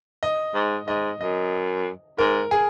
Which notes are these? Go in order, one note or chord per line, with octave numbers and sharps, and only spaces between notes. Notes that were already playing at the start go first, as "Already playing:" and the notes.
D#5
G#2
G#2 D#5
F#2 D#5
G#2 A#4
G#4